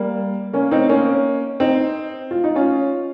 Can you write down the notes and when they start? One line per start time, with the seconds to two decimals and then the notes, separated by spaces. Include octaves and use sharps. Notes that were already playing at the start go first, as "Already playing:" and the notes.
Already playing: G3 A#3
0.53 A#3 C#4
0.71 C4 D#4
0.89 A#3 C#4
1.60 C4 D#4
2.31 F4
2.44 D#4
2.56 C#4 F4